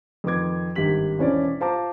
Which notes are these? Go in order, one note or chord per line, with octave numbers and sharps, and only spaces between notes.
F2 D#3 B4 D6 G#6
G#1 G2 G4 B6 F#7
E1 E3 C#4 D4 C5 D5
F4 C5 A5 A#5 D6